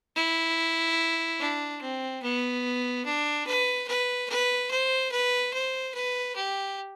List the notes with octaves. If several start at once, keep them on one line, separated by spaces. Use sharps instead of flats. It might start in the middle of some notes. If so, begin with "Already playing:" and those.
E4
D4
C4
B3
D4
B4
B4
B4
C5
B4
C5
B4
G4